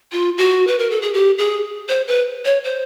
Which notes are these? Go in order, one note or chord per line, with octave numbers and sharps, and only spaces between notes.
F4
F#4
B4
A#4
A4
G#4
G4
G#4
C5
B4
C#5
C5